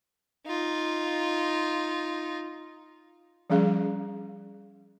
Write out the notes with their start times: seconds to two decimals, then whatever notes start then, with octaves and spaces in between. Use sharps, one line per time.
0.46 D#4 F4
3.50 F3 G3 C#4 G#4 F5